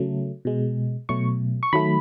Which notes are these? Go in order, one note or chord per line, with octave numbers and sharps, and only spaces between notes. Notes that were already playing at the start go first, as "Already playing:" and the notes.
Already playing: C#3 F#3 A3
B2 G#3
B2 F#3 A3 C#6
C#6
D#3 F#3 A3 B5